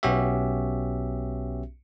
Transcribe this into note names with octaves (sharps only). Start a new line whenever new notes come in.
B1 B3 C#4 F#4 G4 E5